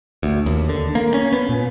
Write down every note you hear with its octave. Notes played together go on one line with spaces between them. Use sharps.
D2
D#2
D3
A#3
C#4
B3
A#2